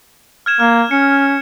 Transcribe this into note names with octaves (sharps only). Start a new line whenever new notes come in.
F6 G#6 E7
A#3 F6
C#4 C#7